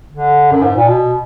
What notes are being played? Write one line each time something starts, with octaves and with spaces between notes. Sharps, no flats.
D3
F#2
G#2
A#2
B2